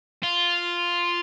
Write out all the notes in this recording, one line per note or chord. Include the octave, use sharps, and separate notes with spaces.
F4